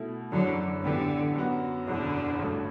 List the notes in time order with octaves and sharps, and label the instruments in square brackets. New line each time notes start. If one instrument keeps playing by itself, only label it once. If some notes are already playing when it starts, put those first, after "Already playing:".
Already playing: [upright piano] B2 A3 E4
[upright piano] F#1 F#2 E3 [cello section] D3 F#3
[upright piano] A2 E3 B3 D4 G4 [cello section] D3
[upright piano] F#2 F#3 B3 F#4
[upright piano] F#1 E2 B2 [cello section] D3
[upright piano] A1 G2 F#3 A3